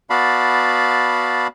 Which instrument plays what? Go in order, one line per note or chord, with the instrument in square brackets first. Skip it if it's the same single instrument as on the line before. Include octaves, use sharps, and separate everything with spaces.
[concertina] B3 F#4 D5 F5 A5 B5